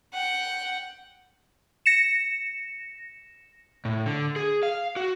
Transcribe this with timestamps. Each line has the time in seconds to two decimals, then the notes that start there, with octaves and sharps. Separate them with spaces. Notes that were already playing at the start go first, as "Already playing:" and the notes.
0.13 F#5 G5
1.86 A#6 C#7 E7
3.85 A2
4.06 D3
4.36 G#4
4.63 F5
4.96 F#4